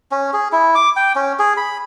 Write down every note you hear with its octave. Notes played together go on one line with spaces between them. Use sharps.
C#4
G#4
E4
D6
G5
C#4
G#4
B5